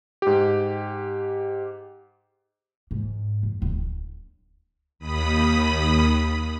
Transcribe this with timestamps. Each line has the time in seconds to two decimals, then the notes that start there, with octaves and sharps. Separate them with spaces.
0.22 G#2 G4
2.91 G#2
3.43 F#2
3.62 D1
4.99 D#2 B5 D#6